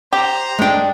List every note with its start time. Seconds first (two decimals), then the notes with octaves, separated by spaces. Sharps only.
0.13 G4 C5 A#5
0.58 G#3 A3 D4 G5